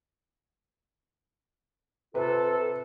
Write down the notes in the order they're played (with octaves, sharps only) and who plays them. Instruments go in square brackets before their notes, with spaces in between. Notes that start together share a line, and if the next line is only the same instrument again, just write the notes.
[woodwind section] C3 F4 A4 [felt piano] B4